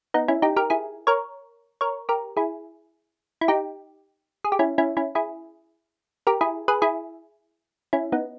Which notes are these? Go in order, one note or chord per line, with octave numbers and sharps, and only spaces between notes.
B3 D#4
C#4 E4
D#4 G4
G4 A#4
E4 G#4
A#4 C#5
A#4 C#5
G4 A#4
E4 G#4
E4
D#4 G4
G#4
G4
C#4 E4
C#4 E4
C#4 E4
E4 G#4
G4 A#4
E4 G#4
G#4 B4
E4 G#4
C#4 E4
B3 D#4